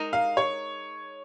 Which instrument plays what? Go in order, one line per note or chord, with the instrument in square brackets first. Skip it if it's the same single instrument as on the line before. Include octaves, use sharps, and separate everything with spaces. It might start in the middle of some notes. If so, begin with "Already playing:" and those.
Already playing: [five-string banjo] G#3 D#4 A#4 D#5
[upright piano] F5
C#5